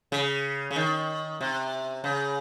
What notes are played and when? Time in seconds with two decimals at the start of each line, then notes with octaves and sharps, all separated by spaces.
0.12 C#3
0.71 C#3
0.76 D#3
1.41 C3
2.04 C#3